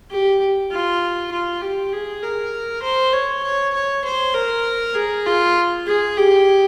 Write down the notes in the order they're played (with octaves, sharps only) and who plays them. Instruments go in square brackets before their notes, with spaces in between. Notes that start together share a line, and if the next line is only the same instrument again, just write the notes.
[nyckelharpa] G4
F4
F4
G4
G#4
A#4
C5
C#5
C#5
C#5
C5
A#4
G#4
F4
G#4
G4